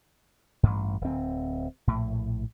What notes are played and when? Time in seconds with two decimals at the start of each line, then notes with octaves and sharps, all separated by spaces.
0.63 A1 G2
1.01 D1 C4
1.87 A#1 A2